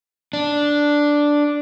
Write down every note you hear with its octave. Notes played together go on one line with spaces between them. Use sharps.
D4